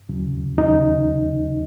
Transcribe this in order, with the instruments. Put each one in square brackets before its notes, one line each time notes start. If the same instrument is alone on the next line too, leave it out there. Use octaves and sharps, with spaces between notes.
[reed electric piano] D#2 C#3 F#3
D#2 C#3 F#3 D#4